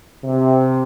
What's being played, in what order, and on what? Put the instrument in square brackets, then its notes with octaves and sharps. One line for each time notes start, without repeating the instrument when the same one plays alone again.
[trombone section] C3